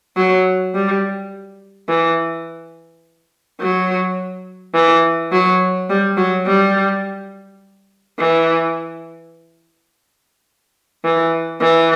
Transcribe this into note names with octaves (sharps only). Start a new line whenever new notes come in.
F#3
G3
E3
F#3
E3
F#3
G3
F#3
G3
E3
E3
E3